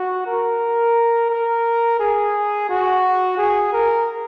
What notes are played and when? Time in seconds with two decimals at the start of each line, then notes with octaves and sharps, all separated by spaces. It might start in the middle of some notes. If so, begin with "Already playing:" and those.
Already playing: F#4
0.26 A#4
1.30 A#4
2.00 G#4
2.69 F#4
3.37 G#4
3.73 A#4